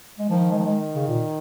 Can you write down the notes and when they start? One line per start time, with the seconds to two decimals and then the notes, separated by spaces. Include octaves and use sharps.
0.19 G#3
0.29 D#3 F3
0.51 G#3
0.59 F3
0.65 G#3
0.94 C#3
1.08 A#2